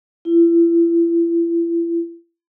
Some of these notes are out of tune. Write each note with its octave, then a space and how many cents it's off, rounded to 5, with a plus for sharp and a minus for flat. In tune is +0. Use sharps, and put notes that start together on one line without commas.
E4 +35